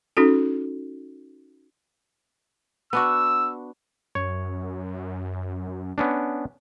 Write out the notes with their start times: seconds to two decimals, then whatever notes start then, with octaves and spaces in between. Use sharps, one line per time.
0.17 C#4 D#4 F#4 A4
2.93 B3 D4 F#4 E6
4.15 F#2 C#5
5.98 B3 C#4 D4